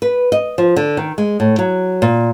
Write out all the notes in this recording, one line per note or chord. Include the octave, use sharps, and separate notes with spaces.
B4
D#5
F3
D3
D#3
G#3
A2
F#3
A#2